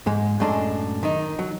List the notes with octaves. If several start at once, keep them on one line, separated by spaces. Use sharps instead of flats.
G#2 G#3
F#2 A2 G#3 D4
D#3 D#4
F#3